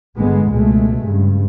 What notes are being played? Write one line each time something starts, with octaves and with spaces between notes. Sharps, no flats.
G1 D3 G#3 B3
C#2 B2 G#3 A3
G2 C#3